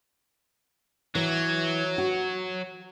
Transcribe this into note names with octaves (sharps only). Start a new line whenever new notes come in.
E3 F#3
F#4